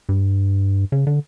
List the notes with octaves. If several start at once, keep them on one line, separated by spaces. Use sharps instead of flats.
G2
C#3
D3